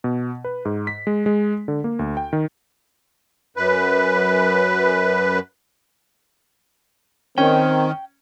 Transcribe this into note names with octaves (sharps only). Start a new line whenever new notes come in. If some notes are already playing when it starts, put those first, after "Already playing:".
B2
B4
G#2
B6
G#3
G#3
D3
A#3
D2
G5
D#3
F#2 B4
D#3 C4 C#4 G5